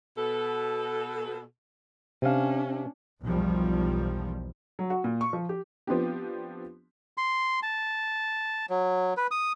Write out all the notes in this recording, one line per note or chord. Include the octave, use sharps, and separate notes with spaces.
B2 A4
C3 C#4 D4 F5
B1 E2 D#3 F3 G3
F#3
F#4
A#2
C#6
F3
G4
F3 B3 C4 D4 G4
C6
A5
F#3
B4
D#6